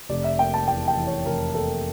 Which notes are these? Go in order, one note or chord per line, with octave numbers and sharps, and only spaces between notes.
F1 D5
E5
A#3 G5
A5
E2 G5
G5
E3
C#5
F1 A#4
A#3 A4